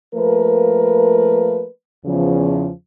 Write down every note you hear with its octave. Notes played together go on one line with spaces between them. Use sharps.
F3 A3 A#3 A#4 B4
E2 C#3 F3